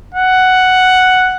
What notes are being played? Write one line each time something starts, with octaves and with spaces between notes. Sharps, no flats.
F#5